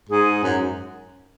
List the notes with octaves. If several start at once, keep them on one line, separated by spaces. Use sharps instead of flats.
G#2 G#4
F#2